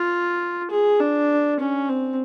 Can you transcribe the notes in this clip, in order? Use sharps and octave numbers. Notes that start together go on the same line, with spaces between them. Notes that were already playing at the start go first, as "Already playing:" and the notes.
Already playing: F4
G#4
D4
C#4
C4